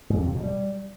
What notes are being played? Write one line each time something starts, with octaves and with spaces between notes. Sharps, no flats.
G#2
F2
C3
B2
G3